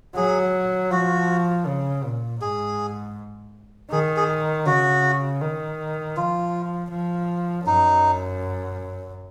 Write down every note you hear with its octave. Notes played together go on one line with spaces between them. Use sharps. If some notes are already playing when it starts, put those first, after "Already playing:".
F#3 G#4
F3 F#4
C#3
A#2
G#2 G#4
D#3 G#4
G#4
C#3 F#4
D#3
F3 F4
F3
F#2 D#4